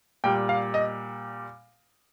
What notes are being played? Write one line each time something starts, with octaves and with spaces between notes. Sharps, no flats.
A#2 G3 G5
F5
D#5